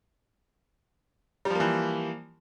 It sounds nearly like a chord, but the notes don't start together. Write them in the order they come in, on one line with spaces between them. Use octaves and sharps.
G3 F3 A#3 E3